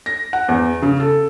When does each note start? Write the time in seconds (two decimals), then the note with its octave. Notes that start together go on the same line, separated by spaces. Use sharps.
0.06 A#6
0.33 F#5
0.48 E2
0.82 C#3
1.00 A4